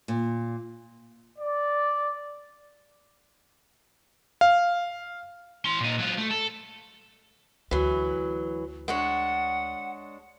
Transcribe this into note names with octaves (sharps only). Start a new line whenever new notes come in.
A#2
D5
F5
E3 C6
A#2 D#4
F#3 F4
A3
A4
D2 E3 F#3
G#3 D4 C#5 F#5